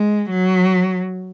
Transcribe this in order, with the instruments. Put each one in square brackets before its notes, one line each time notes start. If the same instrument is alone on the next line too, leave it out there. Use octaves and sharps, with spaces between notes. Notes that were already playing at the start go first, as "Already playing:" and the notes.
Already playing: [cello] G#3
F#3